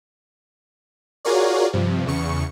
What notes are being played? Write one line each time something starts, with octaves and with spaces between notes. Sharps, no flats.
F4 F#4 G#4 A#4 C#5 D5
G2 C3 F3
E2 C#3 C#6 C#7